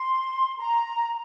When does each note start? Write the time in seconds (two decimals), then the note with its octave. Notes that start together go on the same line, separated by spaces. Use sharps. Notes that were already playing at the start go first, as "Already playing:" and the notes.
Already playing: C6
0.59 A#5